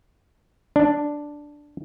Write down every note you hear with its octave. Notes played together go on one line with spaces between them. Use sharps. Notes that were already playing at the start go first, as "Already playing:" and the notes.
D4